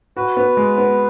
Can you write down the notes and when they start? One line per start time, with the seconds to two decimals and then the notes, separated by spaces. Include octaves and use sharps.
0.17 F#4 B4
0.37 B3
0.57 G#3
0.78 B3